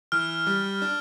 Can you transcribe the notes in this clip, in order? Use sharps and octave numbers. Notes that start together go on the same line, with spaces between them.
E3 F6
G3
D4